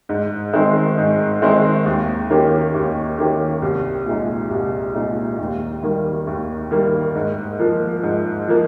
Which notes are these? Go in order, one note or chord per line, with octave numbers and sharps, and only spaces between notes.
G#2
D#3 G#3 C4 D#4
G#2
D#3 G#3 C4 D#4
D#2
D#3 A#3 C#4 G4
D#2
D#3 A#3 C#4 G4
C2
A#2 G#3 D#4
C2
A#2 G#3 D#4
D#2
D#3 G3 A#3
D#2
D#3 G3 A#3
G#2
F3 A#3
G#2
F3 A#3